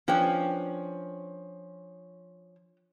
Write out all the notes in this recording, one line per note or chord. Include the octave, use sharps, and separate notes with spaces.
F3 C#4 D4 B4 G5